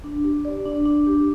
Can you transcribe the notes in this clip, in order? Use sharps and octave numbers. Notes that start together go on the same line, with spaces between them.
D4
G4
D5
D4
D4
G4